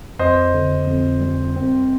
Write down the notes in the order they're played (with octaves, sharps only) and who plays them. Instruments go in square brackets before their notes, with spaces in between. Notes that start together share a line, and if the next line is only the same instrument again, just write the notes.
[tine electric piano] F2 [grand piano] C5 D#5
[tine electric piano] D3
F2
G3
C4